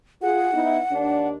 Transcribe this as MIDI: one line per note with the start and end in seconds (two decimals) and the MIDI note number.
0.22 0.48 65
0.22 0.48 68
0.22 1.28 78
0.53 0.79 59
0.53 0.79 63
0.53 0.79 64
0.90 1.37 39
0.90 1.37 62